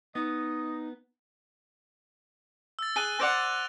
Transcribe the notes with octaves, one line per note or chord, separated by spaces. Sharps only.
B3 D#4 D#5
E6 A6
G#4 F#6 D#7 G7
C5 D5 F#5 A#6 D7 F7